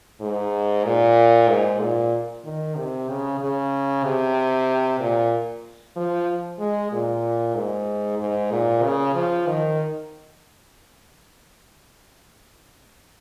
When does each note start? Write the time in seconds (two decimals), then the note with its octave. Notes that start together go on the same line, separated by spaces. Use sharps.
0.21 G#2
0.84 A#2
1.49 G#2
1.80 A#2
2.45 D#3
2.76 C3
3.09 C#3
3.40 C#3
4.04 C3
5.00 A#2
5.96 F3
6.59 G#3
6.92 A#2
7.55 G#2
8.19 G#2
8.51 A#2
8.83 C#3
9.14 F3
9.47 D#3